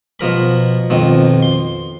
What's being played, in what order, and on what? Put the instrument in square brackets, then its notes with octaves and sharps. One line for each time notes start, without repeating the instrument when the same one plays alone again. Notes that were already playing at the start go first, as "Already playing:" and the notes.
[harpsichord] B2 F3 A#4 B5
F2 B2 D#3 F3
C6